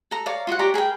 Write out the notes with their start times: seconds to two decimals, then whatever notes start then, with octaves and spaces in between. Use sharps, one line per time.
0.11 A4 A#5
0.26 C#5 D5 F5 A#5
0.47 F4 F#4 C5 F#5
0.59 G4 C#5 D5 A#5
0.74 G#4 A#4 B4 G5